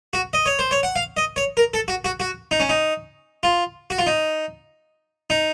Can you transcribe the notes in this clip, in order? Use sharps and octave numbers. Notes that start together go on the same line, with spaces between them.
F#4
D#5
C#5
C5
C#5
F#5
F5
D#5
C#5
A#4
A4
F#4
F#4
F#4
D#4
C#4
D#4
F4
F#4
F4
D#4
D#4